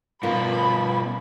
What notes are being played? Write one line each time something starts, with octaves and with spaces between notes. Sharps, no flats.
G2 B2 F4 A#4 B5